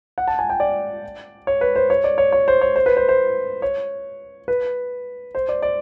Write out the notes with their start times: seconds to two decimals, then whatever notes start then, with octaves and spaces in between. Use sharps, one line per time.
0.18 F#5
0.28 A5
0.39 G#5
0.50 G5
0.60 D5
1.47 C#5
1.61 B4
1.76 C5
1.90 C#5
2.04 D5
2.18 C#5
2.32 C#5
2.48 C5
2.61 C#5
2.76 C5
2.86 B4
2.97 C5
3.09 C5
3.62 C#5
4.48 B4
5.35 C5
5.49 D5
5.62 D5